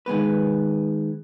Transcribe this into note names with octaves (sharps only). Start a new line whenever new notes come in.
D#3 G#3 B3 B4